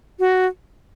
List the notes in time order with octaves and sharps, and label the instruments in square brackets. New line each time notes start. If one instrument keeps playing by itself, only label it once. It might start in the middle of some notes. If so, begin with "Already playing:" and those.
[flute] F#4